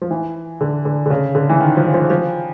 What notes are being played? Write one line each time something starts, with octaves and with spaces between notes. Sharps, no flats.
F3
E3
D3
D3
D3
C#3
D3
E3
D#3
F3
F3
F3